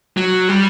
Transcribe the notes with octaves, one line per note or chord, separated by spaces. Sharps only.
F#3
G3